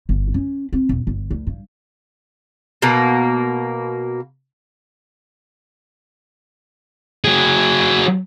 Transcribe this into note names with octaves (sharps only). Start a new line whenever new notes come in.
G1
C#4
C4
E1
G1
D2
G2
B2 A#3
F#3 G#4